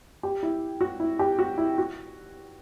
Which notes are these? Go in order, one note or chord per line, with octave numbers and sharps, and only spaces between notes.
G4
E4
F#4
E4
G4
F#4
E4
F#4